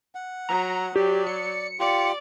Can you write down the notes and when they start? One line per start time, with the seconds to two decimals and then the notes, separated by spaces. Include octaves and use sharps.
0.15 F#5
0.49 F#3 A#5
0.96 F#3 G4 D5
1.27 C#7
1.79 F4 G4 D5